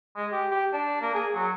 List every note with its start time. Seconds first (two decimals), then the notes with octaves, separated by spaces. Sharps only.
0.16 G#3
0.32 G4
0.51 G4
0.73 D4
1.01 A#3
1.14 G#4
1.34 F#3